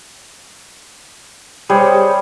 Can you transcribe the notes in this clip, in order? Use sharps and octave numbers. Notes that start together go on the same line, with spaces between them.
G3 G#4 C5 C#5